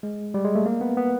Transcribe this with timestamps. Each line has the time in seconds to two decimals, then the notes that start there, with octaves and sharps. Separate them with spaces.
0.03 G#3
0.34 G3
0.45 G#3
0.55 A3
0.66 A#3
0.81 B3
0.97 B3